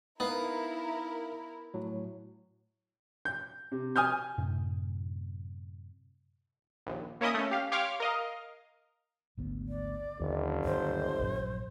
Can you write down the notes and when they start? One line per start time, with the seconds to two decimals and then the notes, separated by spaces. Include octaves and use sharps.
0.20 B3 D#4 E4 A#4 F5
1.74 A2 F#3
3.25 G6
3.72 C3
3.96 G#5 D#6 F6 G6
4.38 F#2 A2 C3
6.87 A#1 D#2
7.21 A#3 C#4 E4 D#5 D#6
7.34 A3 C#4
7.51 G4 F5
7.72 G4 C#5 F5 C6 D6 F6
8.00 A#4 D#5 F5
9.37 G#1 D2 B3
9.68 D5
10.20 F#1 D#2 D3
10.64 D2 G2 D#3 C5
11.19 A#1 G2 F#3